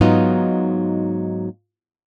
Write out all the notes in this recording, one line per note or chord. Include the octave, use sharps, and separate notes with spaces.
G#2 F#3 B3 D#4 F4